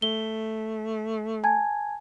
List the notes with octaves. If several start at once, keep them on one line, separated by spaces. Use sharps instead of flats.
A3 G7
G#5 A5 G#6